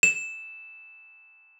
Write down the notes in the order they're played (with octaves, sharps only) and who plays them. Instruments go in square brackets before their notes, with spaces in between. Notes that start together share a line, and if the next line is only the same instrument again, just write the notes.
[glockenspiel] E7